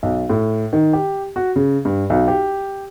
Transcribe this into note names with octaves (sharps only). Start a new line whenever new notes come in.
B1
A2
D#3
G4
F#4
C#3
G2
B1
G4